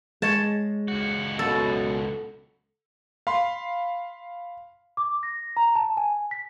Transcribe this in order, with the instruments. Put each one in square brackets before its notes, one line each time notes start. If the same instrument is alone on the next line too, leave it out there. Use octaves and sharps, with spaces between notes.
[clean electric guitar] G#3 [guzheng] C#5 A5
[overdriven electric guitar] C#2 F#4
[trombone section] F#2 B2 [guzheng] A4
[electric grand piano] F5 B5 C6
[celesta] D6
A#6
A#5
A5
G#5
B6